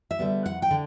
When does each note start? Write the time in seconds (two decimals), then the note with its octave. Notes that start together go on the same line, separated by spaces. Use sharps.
0.11 E5
0.19 D3 G3 B3
0.45 F2 F#5
0.62 G5
0.71 D3